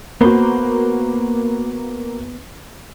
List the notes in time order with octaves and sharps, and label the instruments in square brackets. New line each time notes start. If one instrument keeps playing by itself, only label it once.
[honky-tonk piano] A#3 F#4 [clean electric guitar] B3 B4 C5